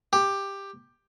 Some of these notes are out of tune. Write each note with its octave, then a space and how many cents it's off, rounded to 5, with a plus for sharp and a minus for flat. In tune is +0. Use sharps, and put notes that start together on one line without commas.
G4 +10